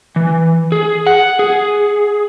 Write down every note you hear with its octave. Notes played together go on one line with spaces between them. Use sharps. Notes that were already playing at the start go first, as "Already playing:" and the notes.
E3
G#4
F#5
G#4